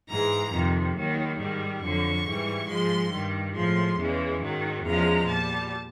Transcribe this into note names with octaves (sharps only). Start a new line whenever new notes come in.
G#2 E3 G#3 A#5
F2 C3 D#3
D#2 D#3 F#3
G#2 D#3 G3
F2 D3 F#3 C#6
G#2 E3 G3
G#2 F3 G#3 C6
G2 D#3 G3
A2 F3 G#3 C6
E2 C#3 E3 G#3
G#2 D#3 F#3
E2 C#3 F3 G#3 A#5
A#2 G3 A5